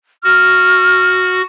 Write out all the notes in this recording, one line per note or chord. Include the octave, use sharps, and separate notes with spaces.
F#4 F6